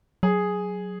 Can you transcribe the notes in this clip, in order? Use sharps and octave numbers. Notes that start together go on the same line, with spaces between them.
F#3 G#4